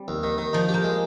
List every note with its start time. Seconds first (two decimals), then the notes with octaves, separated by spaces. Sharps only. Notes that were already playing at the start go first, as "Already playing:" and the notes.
Already playing: G3 C4
0.08 D#2
0.23 D#3
0.38 D#3
0.53 F3 D#4
0.69 G4
0.74 A#3
0.84 G#3